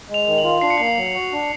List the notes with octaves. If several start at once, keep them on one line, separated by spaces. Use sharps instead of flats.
G#3
F7
D#3
F#7
F4
D4 C7
C#7
A#3 C7
F#3
F#4
D4